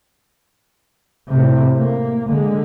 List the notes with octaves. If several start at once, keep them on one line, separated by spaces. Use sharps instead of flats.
A2 C3
A#3
D3 G#3